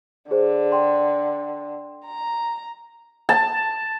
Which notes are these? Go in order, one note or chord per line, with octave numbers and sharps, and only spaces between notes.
D3 G#4 C5
G5 C6
A#5
A5